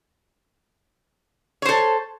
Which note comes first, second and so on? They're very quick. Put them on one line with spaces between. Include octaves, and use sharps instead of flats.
C#5 C5 A4